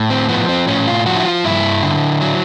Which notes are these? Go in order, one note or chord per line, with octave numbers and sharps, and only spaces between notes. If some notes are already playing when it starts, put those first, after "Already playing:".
Already playing: A2
C4
F3 B3
C4
A2 C#4
F4
F3 F#4
E4
F4
G2 E4
D3
F#3